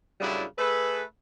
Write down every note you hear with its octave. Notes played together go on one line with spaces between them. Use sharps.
F#2 A2 C#3 G3 D4 E4
A3 G#4 A4 B4